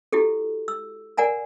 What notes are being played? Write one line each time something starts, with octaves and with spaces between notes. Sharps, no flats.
E4 F#4 G4 A4
E6
A#4 D5 F#5 G#5 A#5